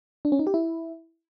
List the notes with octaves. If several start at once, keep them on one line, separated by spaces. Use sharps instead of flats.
D4
C#4
D#4
G4
E4